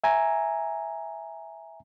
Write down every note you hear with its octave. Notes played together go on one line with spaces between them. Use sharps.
E5 G#5 A#5